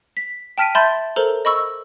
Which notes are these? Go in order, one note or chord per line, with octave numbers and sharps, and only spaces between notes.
B6
G5 A5 F6 B6 D7 D#7
E5 A5 B5 C6 G6 A6
A4 A#4 C5 A#5
D#5 B5 C#6 E6